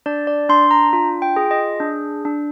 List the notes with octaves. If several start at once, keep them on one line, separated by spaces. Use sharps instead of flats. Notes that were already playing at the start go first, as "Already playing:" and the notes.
D4 D5
D5
D4 C6
A#5
F4
G5
G#4
D#5
D4
D4